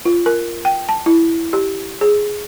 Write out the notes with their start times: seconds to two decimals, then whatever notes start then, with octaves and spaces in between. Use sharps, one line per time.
0.05 F4
0.26 A#4
0.65 G5
0.89 A5
1.06 E4
1.53 G4
2.01 G#4